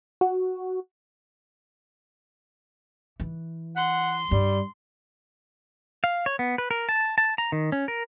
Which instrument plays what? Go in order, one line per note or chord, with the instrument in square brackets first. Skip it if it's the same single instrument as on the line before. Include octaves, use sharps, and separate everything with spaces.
[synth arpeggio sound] F#4
[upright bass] E3
[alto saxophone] F#5 [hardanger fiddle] C6
[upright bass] G2 [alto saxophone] G3
[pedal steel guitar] F5
C#5
B3
B4
A#4
A5
A5
A#5
D#3
C#4
A#4